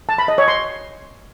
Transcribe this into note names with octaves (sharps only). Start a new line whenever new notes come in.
A5
B5
D#5
C#5
C6